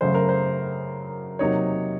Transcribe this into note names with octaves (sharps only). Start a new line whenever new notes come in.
F#2 C#3 F#3 A3 C5
A#4
C5
C3 F#3 A#3 D#4 C#5